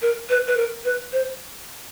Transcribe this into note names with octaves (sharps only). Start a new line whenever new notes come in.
A#4
B4
B4
A#4
B4
C5